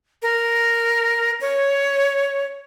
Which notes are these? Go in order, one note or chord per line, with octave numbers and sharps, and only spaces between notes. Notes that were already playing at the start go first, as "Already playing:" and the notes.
A#4
C#5